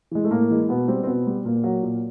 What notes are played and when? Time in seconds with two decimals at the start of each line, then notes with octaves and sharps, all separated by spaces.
0.11 E3 G#3
0.24 A3
0.31 A2 A#3
0.50 E3 G#3
0.69 B2 B3
0.88 G3 C4
1.03 C4
1.07 B2 B3
1.27 G3
1.45 A#2 A#3
1.64 F#3
1.83 A#2